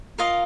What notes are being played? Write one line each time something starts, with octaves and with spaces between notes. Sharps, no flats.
F4 A#4 D#5 F5